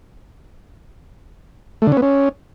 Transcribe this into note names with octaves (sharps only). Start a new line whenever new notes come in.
A3
D3
C#4
B3
C#4